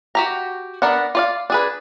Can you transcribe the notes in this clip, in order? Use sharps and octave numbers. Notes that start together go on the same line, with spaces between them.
F#4 G4 A#5
B3 D4 A#4 D5 F#5
F4 D5 F5
D4 G#4 B4